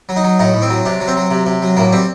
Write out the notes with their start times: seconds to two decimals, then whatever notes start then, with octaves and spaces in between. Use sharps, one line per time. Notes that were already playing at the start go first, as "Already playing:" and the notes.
0.09 F#3
0.16 D#4
0.24 F#3
0.39 A2 D#4
0.54 A2
0.62 C4
0.70 F#3
0.85 C3 D4
1.01 F#3
1.08 C4
1.16 F#3
1.31 C3
1.46 C3
1.62 F#3
1.77 A2 A#3
1.92 G3 C4